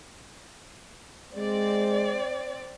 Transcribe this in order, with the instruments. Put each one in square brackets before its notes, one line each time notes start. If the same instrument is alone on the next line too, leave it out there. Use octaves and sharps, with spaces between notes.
[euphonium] G#3 [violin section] C4 D5